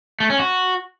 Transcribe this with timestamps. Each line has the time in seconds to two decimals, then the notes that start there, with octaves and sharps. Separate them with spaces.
0.20 A3
0.30 C#4
0.39 F#4